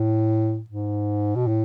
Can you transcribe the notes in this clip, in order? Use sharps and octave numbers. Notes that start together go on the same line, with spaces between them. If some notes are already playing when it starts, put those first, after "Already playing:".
Already playing: A2
G#2
B2
A2